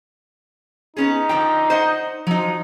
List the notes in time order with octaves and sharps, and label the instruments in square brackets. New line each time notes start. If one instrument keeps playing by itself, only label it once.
[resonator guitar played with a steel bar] B3 C#4 G#4 [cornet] D#4
[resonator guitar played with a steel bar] D3 F3 G5
C5 D#5 F#5
[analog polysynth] F3 [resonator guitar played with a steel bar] F#3 D#4